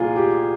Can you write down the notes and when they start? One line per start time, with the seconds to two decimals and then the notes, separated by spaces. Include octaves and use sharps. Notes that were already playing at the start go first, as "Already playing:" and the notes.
Already playing: C2 A#2 F3 F4 G#4
0.16 G4